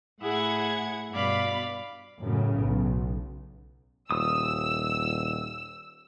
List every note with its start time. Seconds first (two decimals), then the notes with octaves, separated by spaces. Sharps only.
0.22 A2 E4 G#4 F#5 G#6
1.13 G2 B2 D5 F5 B5
2.20 F#2 A2 C#3
2.62 B1
4.11 D#1 D#6 E6